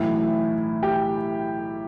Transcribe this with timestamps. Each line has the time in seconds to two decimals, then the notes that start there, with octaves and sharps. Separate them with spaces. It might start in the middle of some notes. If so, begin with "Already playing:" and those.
Already playing: B1 A2 E3 E4
0.83 G4